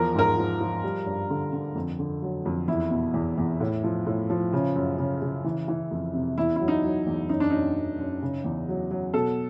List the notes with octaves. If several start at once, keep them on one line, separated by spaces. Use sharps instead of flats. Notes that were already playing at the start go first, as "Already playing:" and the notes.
Already playing: E2 F3 A#4
G#2 A#4
F3
F3
G3
G2
D3
D3
F2
D3
F#3
F2
E2 E4
B2
E2
E2
A2
F3
A2
F3
C#3
F#2
C#3
C#3
E3
E3
F2
C3
E2 E4
F#3 E4
D#4
F#3
E2
F#2 D#4
D4
F#2 D#4
F#2
F#2
C#3
E2
F#3
F#3
B2 A4